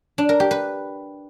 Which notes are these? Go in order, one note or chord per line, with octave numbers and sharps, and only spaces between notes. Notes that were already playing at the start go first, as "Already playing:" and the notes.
D4
A#4
G4
B4